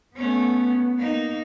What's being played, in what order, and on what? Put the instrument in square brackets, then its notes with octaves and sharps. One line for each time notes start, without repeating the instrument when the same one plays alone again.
[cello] A3 C#4 [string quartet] B3
[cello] A#3 D#4